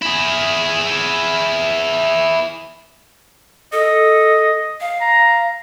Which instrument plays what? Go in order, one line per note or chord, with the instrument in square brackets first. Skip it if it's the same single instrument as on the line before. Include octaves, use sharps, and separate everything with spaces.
[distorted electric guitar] E4 G#4
[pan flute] A4 [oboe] D#5
[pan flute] F5
[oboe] A#5